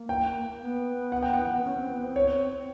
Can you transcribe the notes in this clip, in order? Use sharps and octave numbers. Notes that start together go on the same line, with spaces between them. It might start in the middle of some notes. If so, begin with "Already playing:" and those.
Already playing: A#3
G5
B3
F#5
G5
F#5
C#4
C4
B3
C4
C#5